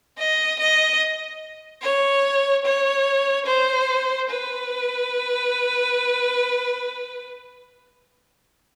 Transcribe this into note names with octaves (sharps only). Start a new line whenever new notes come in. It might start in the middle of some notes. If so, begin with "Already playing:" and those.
D#5
D#5
C#5
C#5
C5
B4